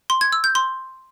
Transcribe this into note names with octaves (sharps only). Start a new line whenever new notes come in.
C6
G#6
E6
G6
C6